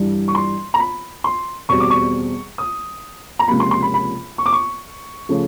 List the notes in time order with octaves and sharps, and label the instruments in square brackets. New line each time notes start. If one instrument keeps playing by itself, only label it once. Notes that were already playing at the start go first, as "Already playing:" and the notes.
Already playing: [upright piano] G2 E3 G3
C#6
C6
A#5
B5
C6
E2 B2 G3 C4 C#6
D6
C#6
D#6
A#5
C#2 C3 F3 A#3 B5
C6
C6
B5
B5
C#6
D6
C#6
C#3 F3 A3 C#4